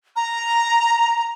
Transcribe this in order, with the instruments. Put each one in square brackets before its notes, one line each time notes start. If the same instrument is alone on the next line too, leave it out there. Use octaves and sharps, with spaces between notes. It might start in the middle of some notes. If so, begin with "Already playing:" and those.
[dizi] A#5